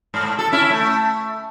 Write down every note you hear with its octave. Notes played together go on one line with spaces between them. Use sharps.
G#2
A4
C#4 E4
A3